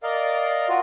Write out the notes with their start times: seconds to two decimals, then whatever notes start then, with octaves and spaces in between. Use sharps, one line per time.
0.03 A#4 D5 D#5 F5
0.69 F4 F#4